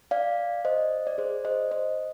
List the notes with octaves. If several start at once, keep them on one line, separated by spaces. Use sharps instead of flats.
D5 F5
C5 D#5
D5
G#4 C5
C5 D#5
C5 D#5